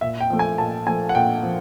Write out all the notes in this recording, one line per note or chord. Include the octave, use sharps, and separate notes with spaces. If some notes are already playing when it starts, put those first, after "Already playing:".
A#2 E5
G5
F3 A3
G#5
A#2 A5
F3 A3 G#5
F#5
A#2 G5
F3